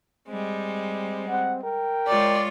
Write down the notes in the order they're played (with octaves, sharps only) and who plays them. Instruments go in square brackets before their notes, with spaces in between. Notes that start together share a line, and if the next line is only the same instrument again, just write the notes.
[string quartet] G3 G#3 [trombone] C4
[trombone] C4 [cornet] F#5
[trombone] A#4 [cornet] G5
[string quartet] G#3 F4 C#5 [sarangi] D5